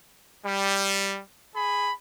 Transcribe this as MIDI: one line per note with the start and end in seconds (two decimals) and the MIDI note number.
0.46 1.20 55
1.56 1.92 68
1.56 1.92 83